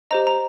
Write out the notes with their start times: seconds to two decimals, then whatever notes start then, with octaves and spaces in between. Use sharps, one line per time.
0.11 G4 C5 D#5 A#5
0.27 A#5